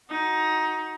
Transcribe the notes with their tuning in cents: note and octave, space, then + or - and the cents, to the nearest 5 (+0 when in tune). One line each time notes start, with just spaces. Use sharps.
D#4 +15 F#4 +0